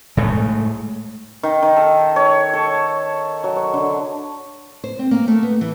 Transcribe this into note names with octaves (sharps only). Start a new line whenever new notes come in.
A2 G#3 A3
D#3
D#3
A4
C#5
A4
F#3
C#5
D3
C5
C4
A#3
A3
B3
E3